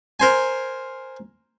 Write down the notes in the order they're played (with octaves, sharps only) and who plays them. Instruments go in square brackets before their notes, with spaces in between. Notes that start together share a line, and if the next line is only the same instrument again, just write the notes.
[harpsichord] A#4 C5 G#5